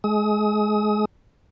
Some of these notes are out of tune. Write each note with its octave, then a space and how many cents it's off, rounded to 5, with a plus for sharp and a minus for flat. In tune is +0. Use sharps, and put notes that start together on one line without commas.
G#3 +25 D#6 +30